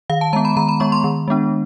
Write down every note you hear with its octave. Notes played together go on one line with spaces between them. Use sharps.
D#3 F5
A5
G#3 B3 A#5
B5
D#3 A#5
B5
G#3 B3 C#6
C6
D#3
G#3 B3 D4